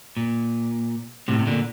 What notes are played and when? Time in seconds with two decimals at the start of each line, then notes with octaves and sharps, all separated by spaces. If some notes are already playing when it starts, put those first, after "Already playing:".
0.17 A#2
1.28 A2 C3
1.39 C3
1.47 A#2 D3